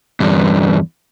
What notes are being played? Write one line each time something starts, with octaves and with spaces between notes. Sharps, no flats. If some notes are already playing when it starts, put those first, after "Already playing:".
E2 G2